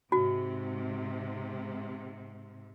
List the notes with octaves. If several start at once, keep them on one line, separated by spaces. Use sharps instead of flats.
G#2 C3 F#4